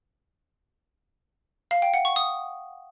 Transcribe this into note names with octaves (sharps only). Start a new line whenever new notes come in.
F5
G5
F#5
C#6
D#6